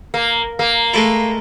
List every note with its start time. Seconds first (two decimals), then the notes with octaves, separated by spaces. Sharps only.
0.14 A#3
0.59 A#3
0.94 G#3 A3 E4